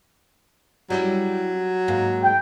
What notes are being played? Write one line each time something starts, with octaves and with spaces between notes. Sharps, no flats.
F#3 G3 C#4 E4
G#2 A#3
G5